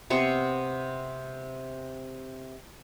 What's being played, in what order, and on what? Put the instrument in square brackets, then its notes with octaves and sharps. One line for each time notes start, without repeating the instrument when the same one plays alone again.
[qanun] C3 B3 C5 C#6